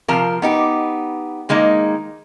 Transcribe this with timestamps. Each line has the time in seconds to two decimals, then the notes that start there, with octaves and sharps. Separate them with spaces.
0.08 C3 F3 F4 A#4
0.42 B3 D#4 G4
1.49 D#3 G#3 A#3 D#4